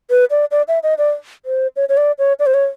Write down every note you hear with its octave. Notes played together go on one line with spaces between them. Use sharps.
B4
D5
D5
E5
D#5
D5
C5
C#5
C#5
D5
C#5
D5
C5
C#5